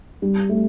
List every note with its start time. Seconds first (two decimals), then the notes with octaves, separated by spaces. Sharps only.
0.22 G3
0.49 A3